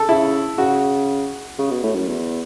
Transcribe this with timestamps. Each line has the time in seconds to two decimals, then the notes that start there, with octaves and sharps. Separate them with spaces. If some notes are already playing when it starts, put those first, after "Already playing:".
Already playing: A4
0.09 C#3 E4
0.58 C#3 F#4
1.59 C#3
1.71 B2
1.83 A2
1.95 F#2
2.07 E2